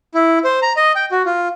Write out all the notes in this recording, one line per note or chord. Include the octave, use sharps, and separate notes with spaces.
E4
C5
A#5
D#5
G5
F#4
F4